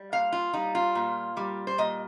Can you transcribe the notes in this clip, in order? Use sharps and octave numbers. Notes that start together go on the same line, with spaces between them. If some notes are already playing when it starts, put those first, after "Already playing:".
Already playing: G3
A#2 F5
F4
G3 D#4
F4
A#2
G3
C5
A#2 D#5